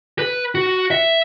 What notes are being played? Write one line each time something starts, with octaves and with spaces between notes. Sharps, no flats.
B4
F#4
E5